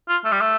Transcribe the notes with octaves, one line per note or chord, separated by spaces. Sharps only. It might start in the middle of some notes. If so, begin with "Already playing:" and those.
F4
A3
G3
A3